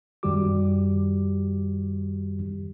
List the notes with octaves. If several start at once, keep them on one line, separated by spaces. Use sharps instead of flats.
F#2 D#3 G3 F#4 G4 D6